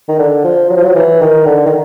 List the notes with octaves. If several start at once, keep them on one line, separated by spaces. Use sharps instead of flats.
D#3
D3
F3
F#3
F3
F#3
E3
D#3
D3
D#3